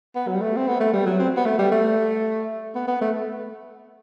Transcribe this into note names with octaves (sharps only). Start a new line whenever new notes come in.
B3
F#3
G3
A3
C4
B3
A3
G3
F#3
C4
B3
A3
G3
A3
B3
B3
A3